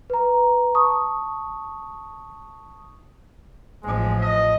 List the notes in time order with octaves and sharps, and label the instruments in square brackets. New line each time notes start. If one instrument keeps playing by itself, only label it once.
[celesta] B4 A#5
A5 C#6 D#6
[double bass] A1 F3 [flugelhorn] G#3
[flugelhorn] D#5